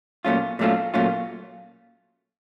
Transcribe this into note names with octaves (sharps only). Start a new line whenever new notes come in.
A#2 F#3 A3 C#4 F4
A#2 F#3 A3 C#4 F4
A#2 F#3 A3 C#4 F4